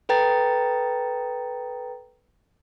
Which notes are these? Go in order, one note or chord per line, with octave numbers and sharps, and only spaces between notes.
A4 B4 G5 A#5 A6